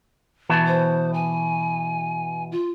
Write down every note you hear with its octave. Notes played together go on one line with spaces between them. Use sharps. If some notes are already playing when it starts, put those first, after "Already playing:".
B2 E3 A5
C5
G#5
F4